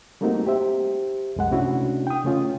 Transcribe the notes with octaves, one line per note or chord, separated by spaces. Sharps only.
G3 A3 A#3 C4 D#4 F#4
G4 C5 E5
C2 F#2 G#3 F#5
C3 A3 C#4 D4 E4 F#4
G5 D#6
C#3 A3 C#4 F4